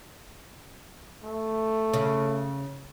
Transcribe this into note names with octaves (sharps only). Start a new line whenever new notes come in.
A3
C#3